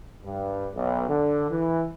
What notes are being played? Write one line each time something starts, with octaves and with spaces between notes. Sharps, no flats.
G2
B1
D3
E3